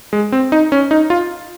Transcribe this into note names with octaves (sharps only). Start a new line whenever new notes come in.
G#3
C4
D#4
C#4
D#4
F4